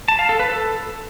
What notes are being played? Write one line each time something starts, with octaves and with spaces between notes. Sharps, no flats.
A5
F5
A4
B4
A4